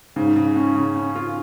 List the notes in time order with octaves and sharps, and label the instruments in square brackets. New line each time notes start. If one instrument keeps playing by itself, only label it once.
[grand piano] G#2 [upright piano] C#3
[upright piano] C#3
C#4
C#3
C#4
F4